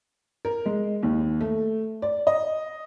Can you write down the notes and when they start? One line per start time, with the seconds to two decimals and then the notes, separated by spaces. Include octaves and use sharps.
0.45 A#4
0.66 G#3
1.03 D#2
1.41 A3
2.02 D5
2.27 D#5